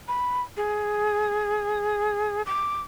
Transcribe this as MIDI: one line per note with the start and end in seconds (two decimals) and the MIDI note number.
0.08 0.43 83
0.57 2.42 68
2.46 2.82 86